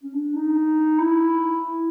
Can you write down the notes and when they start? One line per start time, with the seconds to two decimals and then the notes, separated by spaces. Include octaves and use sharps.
0.03 C#4
0.14 D4
0.36 D#4
0.99 E4